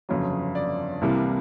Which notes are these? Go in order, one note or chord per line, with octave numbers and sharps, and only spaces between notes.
G1 F2 C#3 F#3
D5
C2 C3 E3 G3 A#3